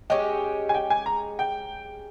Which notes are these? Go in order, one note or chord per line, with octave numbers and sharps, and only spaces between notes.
G#3 C#4 G4 G5
G#5
G5
G#5
A#5
G5